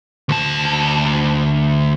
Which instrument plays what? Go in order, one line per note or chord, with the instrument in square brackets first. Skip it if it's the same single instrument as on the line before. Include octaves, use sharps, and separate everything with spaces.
[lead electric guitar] D2 A5